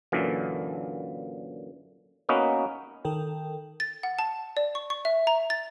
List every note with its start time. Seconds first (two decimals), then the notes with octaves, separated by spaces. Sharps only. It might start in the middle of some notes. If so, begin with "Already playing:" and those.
0.12 F#2 A#2 D3 E3
2.29 A#3 B3 C#4 D#4 F#4 B4
3.05 D#3 A4 A#4 G5
3.80 A6
4.03 F#5
4.19 A5
4.57 D5
4.75 C#6
4.90 C#6
5.05 E5
5.27 A#5
5.50 A6